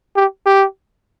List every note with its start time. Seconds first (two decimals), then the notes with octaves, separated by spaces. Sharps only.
0.16 G4
0.46 G4